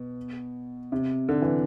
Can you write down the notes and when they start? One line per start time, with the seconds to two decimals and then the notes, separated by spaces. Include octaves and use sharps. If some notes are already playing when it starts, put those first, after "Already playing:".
Already playing: B2
0.92 C3
1.29 D3
1.42 E3